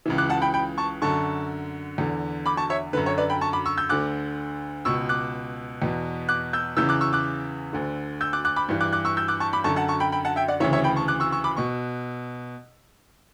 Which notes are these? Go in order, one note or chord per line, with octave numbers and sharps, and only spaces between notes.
C#2 C#3 E3
D6 F#6
F#5 A5
G5 B5
G5 B5
A5 C#6
F#2 D3 A5 C#6
E2 D3
B5 D6
A5 C#6
C#5 E5
F#2 D3 B4
C#5
B4 D5
G5 B5
A5 C#6
B5 D6
C#6 E6
E6 G6
D2 D3 D6 F#6
C#2 B2 C#6 E6
D6 F#6
E2 B2
D6 F#6
E6 G6
E2 C#3 E3 E6 G6
D6 F#6
C#6 E6
D6 F#6
D2 D3
E6 G6
D6 F#6
D6 F#6
B5 D6
G2 E3
D6 F#6
D6 F#6
C#6 E6
E6 G6
D6 F#6
A5 C#6
B5 D6
F#2 D3 A5 C#6
F#5 A5
A5 C#6
G5 B5
G5 B5
F#5 A5
E5 G5
D5 F#5
D2 C#3 E3 C#5 E5
C#5 E5
G5 B5
A5 C#6
D6 F#6
C#6 E6
C#6 E6
B5 D6
B2 C#6